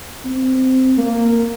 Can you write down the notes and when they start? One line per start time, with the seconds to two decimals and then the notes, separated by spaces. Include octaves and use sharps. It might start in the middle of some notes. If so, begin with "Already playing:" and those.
0.25 C4
0.97 A#3